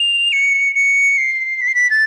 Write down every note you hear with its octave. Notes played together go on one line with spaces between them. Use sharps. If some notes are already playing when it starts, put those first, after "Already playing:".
Already playing: F7
C#7
C#7
C7
B6
C7
B6
A6